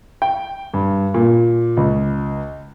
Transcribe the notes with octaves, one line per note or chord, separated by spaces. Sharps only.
G5
G2
A#2
C#2